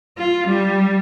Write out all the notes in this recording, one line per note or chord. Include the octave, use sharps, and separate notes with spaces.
F4
G3